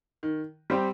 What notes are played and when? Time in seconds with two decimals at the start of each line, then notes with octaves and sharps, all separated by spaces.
0.23 D#3
0.70 G3 C4 G4